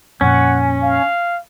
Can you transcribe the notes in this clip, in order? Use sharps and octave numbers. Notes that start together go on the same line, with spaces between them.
F2 A#2 C#4 F#5
F5